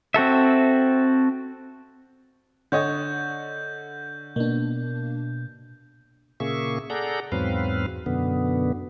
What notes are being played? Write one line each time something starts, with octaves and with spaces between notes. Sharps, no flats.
C4 F#4 A4 E5
D3 C#5 D#5 G6
B2 A#3 D4
A#2 C#3 A#3 G#4 E5 C#6
G#4 A4 D5 F#5 A#5 G6
E2 G#2 F#3 C4 B4 F5
F#2 B2 D3 B3